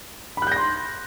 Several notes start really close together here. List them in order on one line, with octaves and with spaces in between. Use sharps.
B5 F#6 G6 A#6 C6